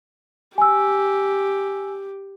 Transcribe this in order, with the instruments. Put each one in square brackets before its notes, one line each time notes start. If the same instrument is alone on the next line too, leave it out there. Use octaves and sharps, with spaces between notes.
[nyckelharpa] G4 [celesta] G#5 E6